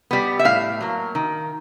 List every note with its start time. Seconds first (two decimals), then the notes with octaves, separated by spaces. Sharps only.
0.11 G3 B3
0.39 E5
0.45 A2 F5
0.81 F#3 A#3
1.15 D#3